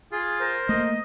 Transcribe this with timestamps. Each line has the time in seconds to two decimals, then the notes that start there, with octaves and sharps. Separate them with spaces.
0.12 F4 G#4
0.40 A#4 C5
0.69 A3 A#3 D#5